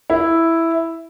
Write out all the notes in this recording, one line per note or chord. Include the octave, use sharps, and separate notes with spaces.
E4